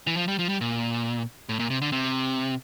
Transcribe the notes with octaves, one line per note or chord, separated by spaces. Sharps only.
E3
F3
G3
F3
G3
A#2
A2
A#2
C3
D3
C3